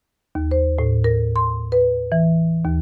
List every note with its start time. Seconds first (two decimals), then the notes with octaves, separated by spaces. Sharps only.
0.35 D#2
0.51 C5
0.79 A2
1.04 A#4
1.36 C6
1.72 B4
2.12 E3
2.65 D#2